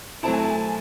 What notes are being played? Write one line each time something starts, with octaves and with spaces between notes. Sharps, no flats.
F#3 A3 C4 E4 A5
G#5
A5